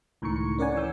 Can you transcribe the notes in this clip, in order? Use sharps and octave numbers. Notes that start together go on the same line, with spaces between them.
C#2 A2 D#3 A#5 C#6 C#7
C#4 A#4 D5 F#5 G#5
E3 E6 G6